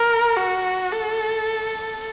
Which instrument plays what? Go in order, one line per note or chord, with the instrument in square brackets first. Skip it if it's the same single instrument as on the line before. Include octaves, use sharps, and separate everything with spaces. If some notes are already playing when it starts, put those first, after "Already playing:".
Already playing: [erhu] A#4
F#4
A4